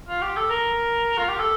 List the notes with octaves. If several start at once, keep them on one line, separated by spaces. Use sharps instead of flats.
F4
G4
A4
A#4
F4
G4
A4